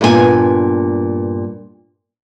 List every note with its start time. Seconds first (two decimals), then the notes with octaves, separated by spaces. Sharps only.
0.01 G2 A#2 B3 F4 G#5